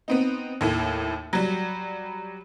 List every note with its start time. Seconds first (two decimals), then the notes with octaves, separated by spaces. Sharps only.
0.08 B3 C4 D#4
0.61 D#2 A2
1.33 F#3 G3